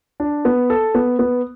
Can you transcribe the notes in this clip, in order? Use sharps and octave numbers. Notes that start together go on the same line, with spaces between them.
D4
B3
A4
B3
B3